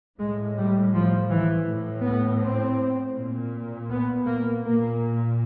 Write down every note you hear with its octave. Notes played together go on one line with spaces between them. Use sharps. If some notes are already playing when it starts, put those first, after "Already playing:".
A2 G#3
G3
F3
E3
A2
B3
C4
A#2
B3
A#3
A#2 A#3